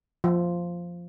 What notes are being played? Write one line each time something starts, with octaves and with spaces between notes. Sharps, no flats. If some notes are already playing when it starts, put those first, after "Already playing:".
F3